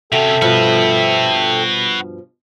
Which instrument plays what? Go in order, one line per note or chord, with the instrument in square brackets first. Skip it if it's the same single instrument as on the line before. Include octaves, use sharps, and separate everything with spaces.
[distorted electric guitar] C3 C#4 [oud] F#4 [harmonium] A4 G5 [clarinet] E5
[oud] G2 B2 F3 [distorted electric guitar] F#4 B4